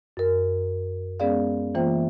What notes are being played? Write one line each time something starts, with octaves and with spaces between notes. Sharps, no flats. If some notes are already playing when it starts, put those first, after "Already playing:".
F#2 A#4
G#3 B3 C#4 G#4 D5 F5
E3 A#3 F4 C5 E5 G5